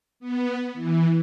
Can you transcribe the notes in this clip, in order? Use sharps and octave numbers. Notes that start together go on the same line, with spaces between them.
B3
E3